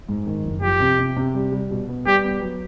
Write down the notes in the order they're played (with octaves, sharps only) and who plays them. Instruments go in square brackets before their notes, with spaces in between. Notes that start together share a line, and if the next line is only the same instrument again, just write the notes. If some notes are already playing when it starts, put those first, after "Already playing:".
[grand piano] G#2
D#3
F#1
[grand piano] F3 [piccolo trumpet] G4
[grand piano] C3
C3
C3
G3
G3
B2
B3
[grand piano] G3 [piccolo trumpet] G4
[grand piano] B3
F#3